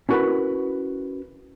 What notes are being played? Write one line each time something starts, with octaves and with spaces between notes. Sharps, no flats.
C#4 E4 F#4 A#4 B4 B5